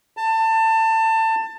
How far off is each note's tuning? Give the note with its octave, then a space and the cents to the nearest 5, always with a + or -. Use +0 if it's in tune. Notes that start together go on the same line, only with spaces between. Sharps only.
A5 +25